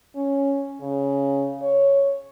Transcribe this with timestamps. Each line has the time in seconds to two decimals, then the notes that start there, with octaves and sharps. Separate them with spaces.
0.15 C#4
0.81 C#3
1.62 C#5